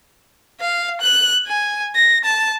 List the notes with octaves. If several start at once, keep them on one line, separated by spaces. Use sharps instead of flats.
F5
F#6
G#5
A#6
A5